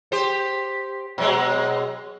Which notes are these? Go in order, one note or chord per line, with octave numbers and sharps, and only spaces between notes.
G4 C5
B2 F#3 G#3